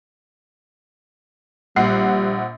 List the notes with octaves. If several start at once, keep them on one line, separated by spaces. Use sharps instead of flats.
A#1 G3 F#5 C7